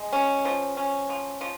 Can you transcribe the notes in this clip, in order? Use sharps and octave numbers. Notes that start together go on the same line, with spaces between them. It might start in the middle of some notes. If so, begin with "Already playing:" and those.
Already playing: G#3
C#4
F3
C#4
F3
F3